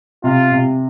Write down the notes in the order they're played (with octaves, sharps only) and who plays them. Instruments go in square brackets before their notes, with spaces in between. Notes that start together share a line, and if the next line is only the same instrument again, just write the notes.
[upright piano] C3 [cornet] F4
[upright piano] C3